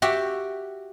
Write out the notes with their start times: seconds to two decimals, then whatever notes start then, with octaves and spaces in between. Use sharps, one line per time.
0.02 F#4 G4 E5 G5